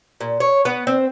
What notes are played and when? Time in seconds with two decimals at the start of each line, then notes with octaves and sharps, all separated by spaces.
0.21 A#2
0.40 C#5
0.65 B3
0.87 C4